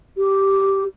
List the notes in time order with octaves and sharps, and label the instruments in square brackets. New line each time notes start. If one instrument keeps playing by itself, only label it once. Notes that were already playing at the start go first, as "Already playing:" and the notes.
[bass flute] G4